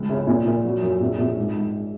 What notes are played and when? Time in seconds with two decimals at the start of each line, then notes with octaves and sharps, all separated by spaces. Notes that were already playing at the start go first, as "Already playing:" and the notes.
Already playing: C#2 G#3
0.09 C#3
0.27 A#2
0.46 A#2
0.64 F#3
0.82 F#2
1.00 A#1
1.19 A#1
1.37 G#2
1.55 G#2